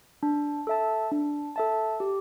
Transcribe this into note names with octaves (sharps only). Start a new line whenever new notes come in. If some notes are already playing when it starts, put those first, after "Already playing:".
D4
A4 E5 A5
D4
A4 E5 A5
G4